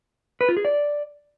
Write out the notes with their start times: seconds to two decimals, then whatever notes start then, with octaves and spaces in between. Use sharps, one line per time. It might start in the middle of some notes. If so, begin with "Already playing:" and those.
0.41 B4
0.49 F4
0.57 G#4
0.65 D5